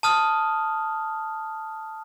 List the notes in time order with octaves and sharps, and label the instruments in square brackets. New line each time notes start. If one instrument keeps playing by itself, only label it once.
[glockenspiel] A5 D#6 F6